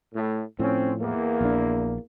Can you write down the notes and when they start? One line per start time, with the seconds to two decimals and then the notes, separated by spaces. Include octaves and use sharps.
0.13 A2
0.59 A2 F3 C4 C#4
1.00 E2 A#3
1.41 A#1 D4